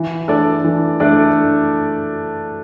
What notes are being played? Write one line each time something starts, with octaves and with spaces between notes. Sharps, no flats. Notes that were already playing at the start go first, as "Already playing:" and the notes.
Already playing: E3
A3 D4 A4 D5
E3
A3 D4 A4 D5